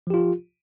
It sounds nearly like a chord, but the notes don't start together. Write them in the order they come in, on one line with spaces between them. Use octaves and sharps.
F3 G4 F4